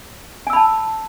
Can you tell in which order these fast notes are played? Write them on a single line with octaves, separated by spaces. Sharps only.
G#5 E6 B5 A5